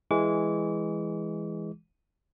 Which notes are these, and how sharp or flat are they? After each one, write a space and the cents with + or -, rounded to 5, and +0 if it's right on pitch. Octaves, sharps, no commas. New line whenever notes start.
E3 +0 G#3 -5 D6 -40